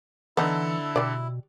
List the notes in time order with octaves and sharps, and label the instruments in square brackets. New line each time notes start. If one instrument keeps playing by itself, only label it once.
[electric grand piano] D3 A4 [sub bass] E3 [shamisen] B3 D#4 [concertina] E4
[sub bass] B2 [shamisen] G3 D5